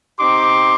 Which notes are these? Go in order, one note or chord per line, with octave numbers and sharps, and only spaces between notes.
C4 D#4 G4 C6 D6